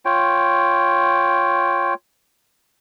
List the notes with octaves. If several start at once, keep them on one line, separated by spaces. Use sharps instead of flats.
F4 C#5 G5